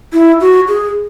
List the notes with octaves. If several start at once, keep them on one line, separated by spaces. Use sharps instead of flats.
E4
F#4
G#4